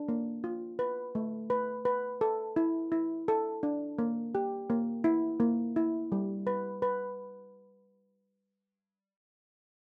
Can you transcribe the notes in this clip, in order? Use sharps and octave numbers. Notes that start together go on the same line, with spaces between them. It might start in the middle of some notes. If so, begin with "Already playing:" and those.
Already playing: D4
A#3
F4
B4
A3
B4
B4
A4
E4
E4
A4
D4
A#3
G4
A#3
E4
A#3
E4
G3
B4
B4